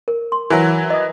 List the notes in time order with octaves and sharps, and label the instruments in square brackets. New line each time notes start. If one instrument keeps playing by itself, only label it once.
[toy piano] A#4
C6
[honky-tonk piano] E3 F#3 [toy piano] A#4 G#5
[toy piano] D#5 D#6